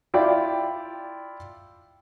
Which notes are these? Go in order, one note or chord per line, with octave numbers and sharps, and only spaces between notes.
E4 F4 D5 G5